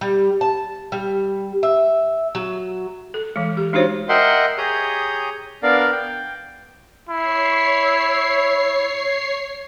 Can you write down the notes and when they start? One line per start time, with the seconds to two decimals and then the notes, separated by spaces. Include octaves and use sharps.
0.01 G3
0.41 A5
0.92 G3
1.63 E5
2.35 F#3
3.14 A4
3.36 E3 G#3
3.57 G4
3.73 G#3 D4 D#4 F#4 C5 C#5
4.09 A#4 D#5 E5 F#5 G5 C6
4.58 G4 G#4 C#5 A#5 D#6 G6
5.63 B3 D4 A#4 D5 F5
5.92 G5
7.09 E4 C#5 C7